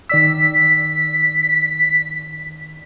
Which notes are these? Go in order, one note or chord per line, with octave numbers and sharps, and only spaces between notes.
D#3 D5 E6 B6